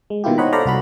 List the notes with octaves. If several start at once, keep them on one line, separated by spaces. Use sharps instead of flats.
G#3
B2 D#3 A#3 E4 F4 G4
C5 C#5 D#5 F#5 A#5 B5
A4 C5 D5 F5 A#5 B5
C2 F#4 B5